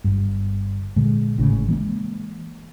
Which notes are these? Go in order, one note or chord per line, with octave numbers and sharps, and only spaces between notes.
G1 G2
A#2 D3 G#3
G#1 A2 C#3
E3 G#3 A#3